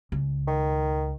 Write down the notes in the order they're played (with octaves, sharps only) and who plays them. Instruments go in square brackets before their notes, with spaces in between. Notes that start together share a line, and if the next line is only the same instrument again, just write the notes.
[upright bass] C#2
[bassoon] D#3